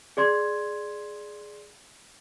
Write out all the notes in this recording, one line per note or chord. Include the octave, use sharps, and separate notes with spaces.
G#4 D5 C6 G#6